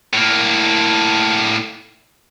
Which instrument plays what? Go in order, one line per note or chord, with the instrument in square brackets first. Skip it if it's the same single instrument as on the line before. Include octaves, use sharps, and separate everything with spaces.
[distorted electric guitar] A2 A#3